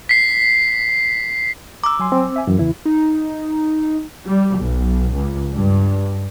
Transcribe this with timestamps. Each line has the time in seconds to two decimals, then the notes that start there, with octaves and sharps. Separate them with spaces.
0.09 B6 C7
1.84 A#5 D6 E6
1.99 F#3 G#5 C6
2.12 C4
2.36 E5 G#5
2.47 F#2 E3
2.59 E2 C#3 E3 E4
2.85 D#4
4.24 G3
4.57 B1
5.13 C#2
5.52 G2